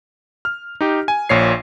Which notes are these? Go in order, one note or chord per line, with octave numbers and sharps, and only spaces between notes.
F6
D#4 G4
G#5
A#1 A#2 C#5 C7